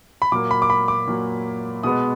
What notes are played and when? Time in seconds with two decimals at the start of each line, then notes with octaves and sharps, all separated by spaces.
0.22 B5
0.32 A#2 F#3 A#3 D6
0.51 B5
0.62 D6
0.70 B5
0.88 D6
1.08 A#2 F#3 A#3
1.83 B2 G#3 B3 D#6